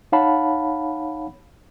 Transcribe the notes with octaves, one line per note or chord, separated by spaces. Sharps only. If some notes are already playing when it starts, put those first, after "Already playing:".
D#4 C#5 F5 F#5 A5 B5